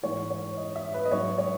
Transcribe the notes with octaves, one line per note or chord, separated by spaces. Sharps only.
G#2 E3 C#5
C#5
D#5
E5
B4
D#5
G#2 F#3 C#5
C#5